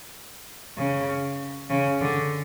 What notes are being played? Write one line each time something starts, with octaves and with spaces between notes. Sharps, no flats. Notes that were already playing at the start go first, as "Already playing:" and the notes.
C#3
C#3
D3